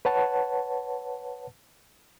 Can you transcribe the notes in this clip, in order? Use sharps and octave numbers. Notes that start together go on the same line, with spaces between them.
B4 C#5 F#5 A5